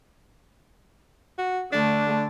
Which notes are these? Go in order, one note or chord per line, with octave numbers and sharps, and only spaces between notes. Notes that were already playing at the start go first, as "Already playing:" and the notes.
F#4
D3 A3 D4